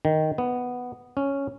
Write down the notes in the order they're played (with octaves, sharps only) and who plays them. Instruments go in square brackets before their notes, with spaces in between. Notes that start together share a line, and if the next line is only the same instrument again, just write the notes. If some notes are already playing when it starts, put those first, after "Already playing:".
[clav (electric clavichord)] D#3
B3
C#4